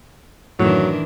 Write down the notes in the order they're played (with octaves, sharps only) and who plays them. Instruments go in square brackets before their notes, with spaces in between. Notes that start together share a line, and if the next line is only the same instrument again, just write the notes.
[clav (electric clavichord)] F#2 A2 [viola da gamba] D#3 E3 D4 [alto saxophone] F#3